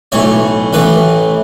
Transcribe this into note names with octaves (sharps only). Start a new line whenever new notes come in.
B1 A2 E3 C#5
A1 A2 E3 B4